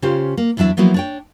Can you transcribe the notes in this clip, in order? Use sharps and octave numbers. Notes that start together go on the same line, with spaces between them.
C#3 C#4 F4 G4 C5
A#3
E2 F#3 D4 E4 E5
F3 F#3 A#3 B3 E4 F#4
D4 C#5 G5